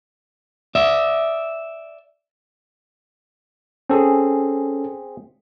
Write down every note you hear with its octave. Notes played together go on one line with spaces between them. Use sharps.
D5 E5
C4 C#4 G#4 A4